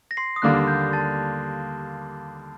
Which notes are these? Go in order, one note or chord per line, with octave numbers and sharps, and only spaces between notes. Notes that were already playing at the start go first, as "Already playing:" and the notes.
A#6
C6 C7
D#6
D#2 D3 G3 A#3 D4 F#6
G6
A5 A6